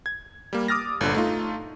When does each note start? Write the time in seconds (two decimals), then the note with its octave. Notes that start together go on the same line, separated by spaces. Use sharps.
0.06 G#6
0.53 G3 A#3
0.68 D6 D#6 F6 A6 A#6
1.01 G1 A#2 D3
1.14 A3 D#4 F4